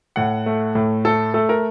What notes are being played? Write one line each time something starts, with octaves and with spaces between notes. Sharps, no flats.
A2 F#5
A3
A2
A3 A4
A3 A4
A#4